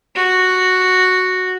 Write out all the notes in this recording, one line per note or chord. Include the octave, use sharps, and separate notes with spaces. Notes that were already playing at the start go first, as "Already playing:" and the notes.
F#4